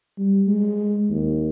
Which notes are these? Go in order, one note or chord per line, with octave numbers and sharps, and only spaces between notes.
G3
G#3
D#2